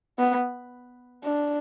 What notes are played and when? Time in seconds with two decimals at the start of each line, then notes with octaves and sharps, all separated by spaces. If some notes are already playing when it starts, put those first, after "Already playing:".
0.19 B3
1.24 D4